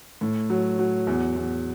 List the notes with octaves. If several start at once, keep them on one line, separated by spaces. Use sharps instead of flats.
A2
F#3
F#3
E2
E2